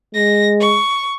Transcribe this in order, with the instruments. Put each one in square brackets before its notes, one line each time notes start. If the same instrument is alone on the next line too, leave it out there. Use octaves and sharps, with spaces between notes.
[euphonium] G#3 [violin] A#6
[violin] C#6